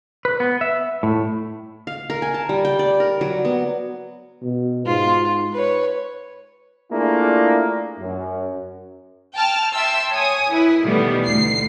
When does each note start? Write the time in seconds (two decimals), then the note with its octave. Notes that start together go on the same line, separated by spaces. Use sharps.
0.25 B4
0.40 B3
0.61 E5
1.03 A2
1.87 F5
2.10 A#4
2.22 G#5
2.34 A5
2.49 G3
2.65 G5
2.79 D5
3.00 A#4
3.21 F#3
3.45 B3
4.42 B2
4.86 G#2 F4
5.53 B4 C#5
6.91 A3 A#3 D4 E4 F4 G#4
8.00 F#2
9.36 G5 A5 F6
9.73 E5 G5 A5 C6 E6
10.12 C#5 G#5 D#6
10.50 E4 B4
10.82 B2 D#3 E3 G3 A3 B3
11.26 D2 C7